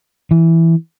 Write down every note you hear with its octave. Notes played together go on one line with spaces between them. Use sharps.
E3